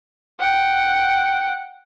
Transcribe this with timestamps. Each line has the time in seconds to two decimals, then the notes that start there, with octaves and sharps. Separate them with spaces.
0.40 F#5 G5